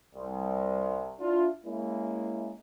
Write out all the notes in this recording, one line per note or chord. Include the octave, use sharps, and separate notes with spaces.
C2
D4 E4 F4
G#3 A#3 C#4 E4